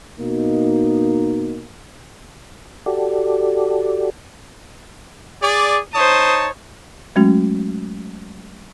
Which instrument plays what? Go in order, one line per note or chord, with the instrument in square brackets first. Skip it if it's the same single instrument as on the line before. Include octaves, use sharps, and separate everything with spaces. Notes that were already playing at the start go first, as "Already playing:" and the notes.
[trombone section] B2 A#3 D#4
[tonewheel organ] F#4 G4 A4 D5
[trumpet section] G#4 D5
[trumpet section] D#4 C#5 A5 [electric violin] C5 D#6
[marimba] F#3 G#3 A3 C#4 F#4